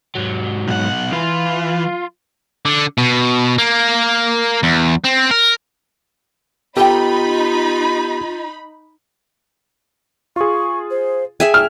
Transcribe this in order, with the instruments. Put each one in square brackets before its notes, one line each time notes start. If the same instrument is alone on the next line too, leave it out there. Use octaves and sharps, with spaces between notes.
[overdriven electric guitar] G#2 F#3
[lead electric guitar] B1 F#5
[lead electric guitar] E3 [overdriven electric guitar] F4
[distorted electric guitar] D3
B2
A#3
E2
C4
A#4
[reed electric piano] B3 G4 [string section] D#4 B5 [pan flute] F4 [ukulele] A4 G5
[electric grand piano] F4 G#4 [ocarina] C#6
[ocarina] C5
[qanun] G#4 E5 G#5 [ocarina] G5
[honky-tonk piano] F6